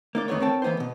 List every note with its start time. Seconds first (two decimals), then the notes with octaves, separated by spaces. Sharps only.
0.15 A#3 D#4 D5
0.28 F2 D#3 G#3 A3 B3 C#5
0.40 C4 A#4 C#5 G5 A5
0.62 E3 A#3 B3 D#4 C5
0.77 D#2 B2